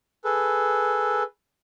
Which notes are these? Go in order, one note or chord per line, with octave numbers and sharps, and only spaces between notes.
G#4 A4 B4